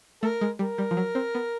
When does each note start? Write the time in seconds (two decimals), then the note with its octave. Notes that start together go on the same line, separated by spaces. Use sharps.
0.23 A3 A#4
0.41 G#3
0.59 G3 A#4
0.78 G3
0.91 F3
0.97 F#3
1.15 C4
1.35 B3